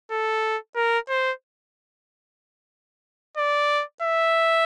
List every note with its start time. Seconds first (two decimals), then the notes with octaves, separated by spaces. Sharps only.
0.11 A4
0.76 A#4
1.09 C5
3.37 D5
4.02 E5